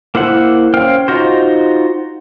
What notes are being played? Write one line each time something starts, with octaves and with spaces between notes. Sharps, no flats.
A#3 E4 C5 F#5
C#4 C5 F5 G5 F6
D#4 F4 F#4 C5